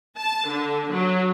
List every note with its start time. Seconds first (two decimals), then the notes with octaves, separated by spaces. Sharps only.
0.17 A5
0.48 D3
0.92 F#3